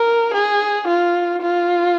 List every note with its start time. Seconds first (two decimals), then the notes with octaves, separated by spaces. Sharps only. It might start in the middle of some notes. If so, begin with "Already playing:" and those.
Already playing: A#4
0.34 G#4
0.87 F4
1.41 F4